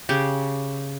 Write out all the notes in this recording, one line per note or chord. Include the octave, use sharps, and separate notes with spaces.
C#3 G4